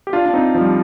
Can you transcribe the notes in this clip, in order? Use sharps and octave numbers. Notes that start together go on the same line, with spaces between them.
G4
D4 F4
D4
C4 D#4
F3
G3